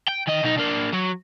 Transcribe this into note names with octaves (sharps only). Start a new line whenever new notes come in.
G5
D#3 D#5
B2 D#4
A#3 D4
F#3